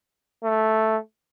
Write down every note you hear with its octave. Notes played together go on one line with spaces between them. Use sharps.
A3